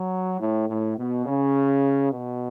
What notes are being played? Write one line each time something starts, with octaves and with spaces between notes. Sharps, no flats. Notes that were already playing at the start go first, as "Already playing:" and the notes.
Already playing: F#3
A2
A2
B2
C#3
B2